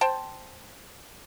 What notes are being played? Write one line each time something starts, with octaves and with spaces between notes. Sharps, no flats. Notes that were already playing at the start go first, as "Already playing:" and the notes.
C5 G5 A5